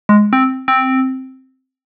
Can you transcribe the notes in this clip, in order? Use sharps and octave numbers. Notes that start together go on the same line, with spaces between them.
G#3
C4
C4